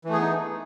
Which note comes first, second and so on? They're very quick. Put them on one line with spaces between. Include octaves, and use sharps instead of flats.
E3 A3 G#4 B3 D#4